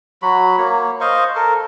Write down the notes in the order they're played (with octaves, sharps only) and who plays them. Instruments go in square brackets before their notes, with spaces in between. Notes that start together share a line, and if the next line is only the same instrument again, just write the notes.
[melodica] F#3 F#4 B5
A#3 C#5
C5 D#5 F5 C#6
A4 A#4